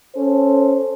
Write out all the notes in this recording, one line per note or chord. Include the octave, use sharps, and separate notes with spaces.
C#4 A4 C5